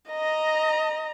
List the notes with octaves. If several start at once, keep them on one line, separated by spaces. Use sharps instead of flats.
D#5 A#5